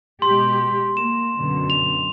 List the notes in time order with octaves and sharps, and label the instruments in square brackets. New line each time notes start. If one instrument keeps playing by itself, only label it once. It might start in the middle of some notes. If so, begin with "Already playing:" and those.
[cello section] B2 G#3 G4 [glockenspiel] C6
[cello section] A#3 [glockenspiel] E7
[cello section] F#2 B2 D3
[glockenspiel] F7